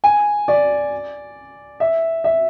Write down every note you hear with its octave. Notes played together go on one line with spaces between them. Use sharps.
G#5
D5
E5
E5